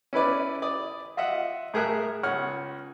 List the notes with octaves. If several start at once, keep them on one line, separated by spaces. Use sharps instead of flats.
C#4 E4 B4 D5
D5 D#6
F4 D#5 E5 F#5
A2 G#4 A#4 E5 F#6
C#2 C#5 F#5 F6